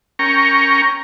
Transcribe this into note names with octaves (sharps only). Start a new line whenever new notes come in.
C#4 A#4 G5 A#5 C#6